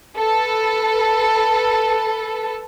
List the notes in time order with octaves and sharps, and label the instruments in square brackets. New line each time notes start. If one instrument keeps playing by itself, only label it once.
[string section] A4 B4